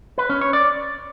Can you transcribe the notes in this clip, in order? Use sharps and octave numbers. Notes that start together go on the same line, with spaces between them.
B4
C#4
C#5
D5